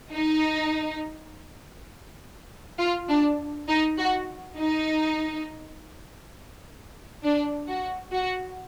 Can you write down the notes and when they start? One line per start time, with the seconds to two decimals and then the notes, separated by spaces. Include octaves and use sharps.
0.13 D#4
2.79 F4
3.09 D4
3.69 D#4
3.98 F#4
4.57 D#4
7.24 D4
7.68 F#4
8.13 F#4